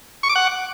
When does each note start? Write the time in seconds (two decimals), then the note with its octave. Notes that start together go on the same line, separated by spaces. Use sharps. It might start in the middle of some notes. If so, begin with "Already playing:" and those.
0.23 C#6
0.29 D6
0.36 F#5